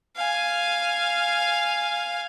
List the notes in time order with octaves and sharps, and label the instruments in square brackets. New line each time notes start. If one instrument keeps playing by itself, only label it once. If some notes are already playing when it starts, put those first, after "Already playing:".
[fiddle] F5 G#5